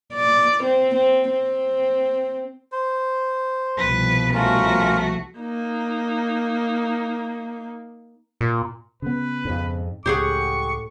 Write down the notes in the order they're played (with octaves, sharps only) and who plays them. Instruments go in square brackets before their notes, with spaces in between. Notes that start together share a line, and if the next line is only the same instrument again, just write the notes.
[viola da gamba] D5
C4
C4
C4
[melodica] C5
[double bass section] C2 B2 F3 [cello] B4
[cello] A3 F#4 [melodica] C#4 F4 A#4
[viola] A#3 D#4
[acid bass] A#2
[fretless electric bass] C#3 B3 [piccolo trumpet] B4
[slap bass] F2 G#2
[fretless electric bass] C#2 [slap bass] A2 [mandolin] G4 G#4 F#5 [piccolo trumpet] C#6